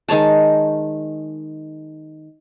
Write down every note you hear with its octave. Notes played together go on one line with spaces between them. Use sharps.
D#3 G#3 C#5 A5